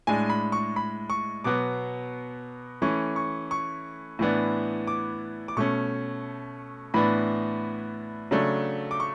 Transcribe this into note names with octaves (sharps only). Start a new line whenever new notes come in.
A2 G#3 D4 G#5
B5
C#6
B5
C#6
B2 F#3 B3 D6
E3 A3 C#4 C#6
C#6
C#6
A2 E3 B3 D4
D6
D6
B2 A3 C#4 C#6
A2 E3 B3 D4 B5
C#3 F#3 A3 D4
D6
C#6